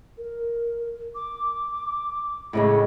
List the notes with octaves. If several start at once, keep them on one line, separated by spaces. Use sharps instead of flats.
A#4
D6
A2 C#3 G#3 B5